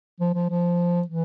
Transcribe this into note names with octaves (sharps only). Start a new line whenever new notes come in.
F3
F3
F3
E3